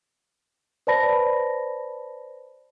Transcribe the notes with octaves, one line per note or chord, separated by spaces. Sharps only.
B4 C5 D5 A5 B5 A#6